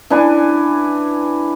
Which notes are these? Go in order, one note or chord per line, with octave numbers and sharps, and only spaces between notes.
E3 D4 B4 G#5